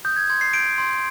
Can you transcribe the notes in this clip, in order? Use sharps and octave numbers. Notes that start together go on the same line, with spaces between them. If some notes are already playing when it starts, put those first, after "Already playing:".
D#6 G6
G#6
C6 G#6
C7
G6 D7
C6